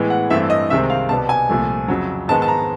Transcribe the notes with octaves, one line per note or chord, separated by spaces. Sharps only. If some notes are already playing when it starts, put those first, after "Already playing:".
Already playing: A2 E3 G#3 B3
F#5
G2 E3 A3 C4 E5
D#5
C2 C3 D#3 G#3 C4 E5
F5
C2 B2 G3 B3 A5
G#5
C2 A#2 F3 A3
F2 C#3 F#3
G#2 D#3 G#3 B3 A5
A5
A#5